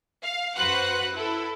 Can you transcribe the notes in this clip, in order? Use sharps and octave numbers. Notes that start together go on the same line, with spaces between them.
F5
F#2 F#4 B4 C5 F#5 F#6
E4 A4